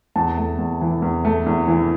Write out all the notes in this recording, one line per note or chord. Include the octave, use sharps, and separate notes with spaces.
E2 A5
A3
E2
E3
E2
A3
E2
E3